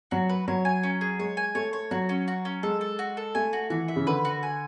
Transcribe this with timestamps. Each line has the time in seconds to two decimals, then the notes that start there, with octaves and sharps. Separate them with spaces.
0.11 F#3 F#4
0.29 B4
0.48 F#3 C#5
0.65 G#5
0.83 C#4
1.01 G#4
1.19 G#3 C#5
1.37 G#5
1.55 A3 C#5
1.73 C#5
1.91 F#3 F#4
2.09 C#4
2.28 F#4
2.45 C#4
2.63 G#3 A4
2.81 A4
2.99 F#4
3.17 A4
3.35 A3 G#5
3.53 F#4
3.70 E3 F#4
3.88 E5
3.96 C#3
4.07 D3 B4
4.25 F#4
4.43 G#5